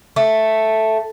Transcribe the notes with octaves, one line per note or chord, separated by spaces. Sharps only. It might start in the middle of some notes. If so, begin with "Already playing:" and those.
A3